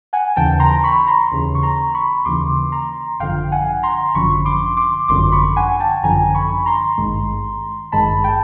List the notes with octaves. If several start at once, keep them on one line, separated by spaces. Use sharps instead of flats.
F#5 G#5
D#2 C#3 E3 G5 A5
A#5 C6
B5 C#6
A#5 C6
D#2 C#3 E3
C#6
A#5 C6
B5 C#6
D#2 C#3 E3 C6 D6
A#5 C6
G#1 F#2 D3 F3 F5 G5
F#5 G#5
A#5 C6
G#1 F#2 D3 F3 B5 C#6
C6 D6
C6 D6
G#1 F#2 D3 F3 C6 D6
B5 C#6
F#5 G#5
G5 A5
G#1 F#2 D3 F3 G#5 A#5
B5 C#6
A#5 C6
G#1 G2 D#3 G#3
G#1 G2 D#3 G#3 A5 B5
G5 A5